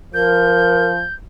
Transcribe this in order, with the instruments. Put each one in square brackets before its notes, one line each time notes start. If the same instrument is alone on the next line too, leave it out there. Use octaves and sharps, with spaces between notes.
[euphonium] F3 [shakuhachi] A#4 [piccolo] G6